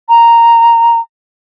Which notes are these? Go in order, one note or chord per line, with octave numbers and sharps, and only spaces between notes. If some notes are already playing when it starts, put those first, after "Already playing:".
A#5